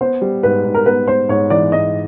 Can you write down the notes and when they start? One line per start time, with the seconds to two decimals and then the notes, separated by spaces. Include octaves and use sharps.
0.01 B3 C5
0.22 G3
0.43 G#2 B4
0.65 G#2
0.74 A#4
0.86 B3 B4
1.07 B3 C5
1.29 G#2 C#5
1.50 E3 D5
1.72 G#2 D#5